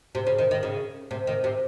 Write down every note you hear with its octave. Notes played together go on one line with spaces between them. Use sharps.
C3
C#3
D#3
D#3
C#3
C3
D#3
C3